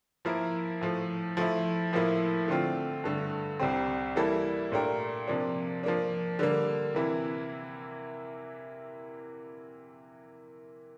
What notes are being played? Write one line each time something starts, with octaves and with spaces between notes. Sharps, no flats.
F3 A#3 E4 A#4
A2 F3 A3
F3 A3 E4
A2 F3 A#3 E4
D3 A3 C4 F4
G2 D3 A3
C2 C3 G3 C4
E3 G3 A#3 E4 A4
A#2 A3 D4 G4 A#4
C3 F3 A#3 D4
F3 A#3 D4
D3 G3 A#3
C3 E3 A#3 E4